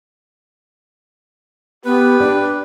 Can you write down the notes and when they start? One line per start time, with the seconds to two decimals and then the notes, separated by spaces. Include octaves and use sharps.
1.85 B3 G4 B4
2.20 D4 D5